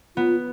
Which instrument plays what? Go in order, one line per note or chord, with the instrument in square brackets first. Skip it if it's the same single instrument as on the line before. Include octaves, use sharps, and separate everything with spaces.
[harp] B3 [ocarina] F4